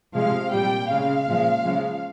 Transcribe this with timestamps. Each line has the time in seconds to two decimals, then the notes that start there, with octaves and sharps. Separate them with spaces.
0.14 C3 F3 G#3 F5
0.52 A#2 G3 G5
0.89 C#3 G#3 F5
1.28 A#2 F3 G#3
1.64 C#3 F3 G#3